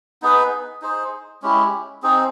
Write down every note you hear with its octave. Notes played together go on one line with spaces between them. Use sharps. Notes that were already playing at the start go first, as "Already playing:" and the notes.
B3 D#4 G#4 B4
D#4 G#4 C5
G#3 C#4 E4 G4
C4 D#4 G#4